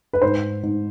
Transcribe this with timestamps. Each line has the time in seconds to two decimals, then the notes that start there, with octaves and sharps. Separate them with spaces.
0.13 B4
0.22 G#2 C5
0.63 G#2